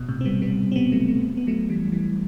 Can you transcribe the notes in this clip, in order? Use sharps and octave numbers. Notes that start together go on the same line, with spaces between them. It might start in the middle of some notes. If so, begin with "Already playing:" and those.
Already playing: B2
A2 C3
C4
G3 B3
G3 B3
C4
G3 B3
F#3 A3
F#3 A3
B3
F#3 A3
E3 G3
E3 G3